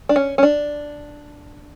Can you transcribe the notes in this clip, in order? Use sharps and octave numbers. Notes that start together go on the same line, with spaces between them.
D4
C#4
C#4
D4